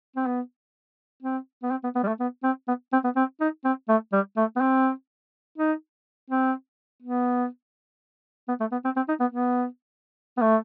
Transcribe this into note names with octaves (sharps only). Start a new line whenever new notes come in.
C4
B3
C4
B3
C4
B3
B3
G3
A3
B3
C4
B3
C4
B3
C4
D#4
C4
A3
G3
A3
B3
C4
D#4
C4
B3
B3
A3
B3
C4
C4
D#4
B3
B3
B3
A3